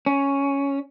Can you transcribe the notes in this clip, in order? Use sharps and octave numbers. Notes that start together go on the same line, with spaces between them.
C#4